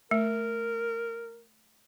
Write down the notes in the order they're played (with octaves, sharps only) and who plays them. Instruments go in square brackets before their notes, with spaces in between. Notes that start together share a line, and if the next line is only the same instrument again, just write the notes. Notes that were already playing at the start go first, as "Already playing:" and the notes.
[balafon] A3 [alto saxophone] A#4